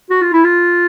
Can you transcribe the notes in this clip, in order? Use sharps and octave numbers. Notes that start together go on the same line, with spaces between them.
F#4
F4
E4
F4